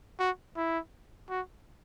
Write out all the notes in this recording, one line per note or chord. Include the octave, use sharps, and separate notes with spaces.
F#4
E4
F#4